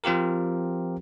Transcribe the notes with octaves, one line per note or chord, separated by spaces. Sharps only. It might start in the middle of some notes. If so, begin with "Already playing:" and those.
F3 C4 F4 G4 A#4